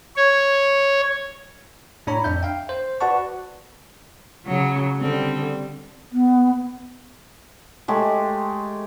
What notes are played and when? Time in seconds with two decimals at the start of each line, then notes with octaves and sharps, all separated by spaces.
0.16 C#5
2.07 A2 D4 C#5 A#5 B5
2.24 F2 D4 E5 G6
2.43 F5 G5
2.69 C5
3.01 F#4 B4 D5 F#5 A5 C#6
4.46 C#3 F#3
4.99 D3 G3 C4
6.12 B3
7.88 G#3 A3 G4